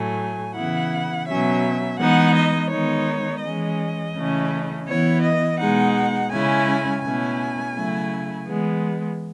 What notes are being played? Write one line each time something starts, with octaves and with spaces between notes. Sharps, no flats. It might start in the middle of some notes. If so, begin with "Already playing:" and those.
Already playing: A2 F#3 A3 G#5
C#3 E3 B3 E4 F#5
B2 F#3 C#4 E5
E3 G#3 B3 D#4 F#5
D#5
D#3 G#3 B3 D#4 C#5
E3 G#3 C#4 D#5
C#3 E3 A3 C#4 E4
E3 B3 E4 C#5
D#5
B2 G#3 D#4 F#5
C#3 G#3 C#4 E4 G#5
B2 A3 C#4 E4 G#5
C#3 F#3 A3 E4
E3 G#3 B3